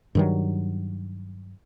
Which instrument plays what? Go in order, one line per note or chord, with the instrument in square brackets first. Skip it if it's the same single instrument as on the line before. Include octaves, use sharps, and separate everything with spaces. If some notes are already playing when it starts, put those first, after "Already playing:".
[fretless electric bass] G2 D#3 F#3